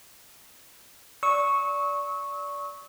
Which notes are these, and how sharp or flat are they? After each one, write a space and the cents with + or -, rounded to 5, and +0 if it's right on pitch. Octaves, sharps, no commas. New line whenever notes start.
D5 -20 C#6 -5 E6 -35